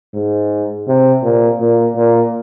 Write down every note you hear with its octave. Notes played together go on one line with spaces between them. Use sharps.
G#2
C3
A#2
A#2
A#2